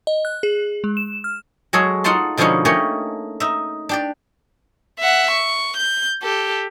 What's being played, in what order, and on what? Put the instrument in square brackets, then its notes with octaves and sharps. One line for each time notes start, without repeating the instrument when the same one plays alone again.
[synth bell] D#5
F#6
G#4
G#3
E7
F6
[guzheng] F#3 G#3 G#4 A4 C#5
D#4 F4 F#5 A5 C6
B2 D3 F3 G#3 C#4 D#4
A3 A#3 C#4 G4 C#5 D#5
D#4 E5
D4 G4 D5
[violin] E5 F#5
C#6
G6
G4 A4